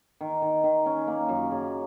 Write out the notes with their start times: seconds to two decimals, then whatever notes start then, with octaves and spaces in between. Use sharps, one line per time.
0.21 D#3
0.42 D#3
0.64 D#3
0.86 C#4
1.07 A#3
1.29 F#2
1.51 C#3